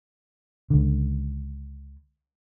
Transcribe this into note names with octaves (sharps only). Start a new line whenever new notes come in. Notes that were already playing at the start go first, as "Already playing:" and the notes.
C#2 D3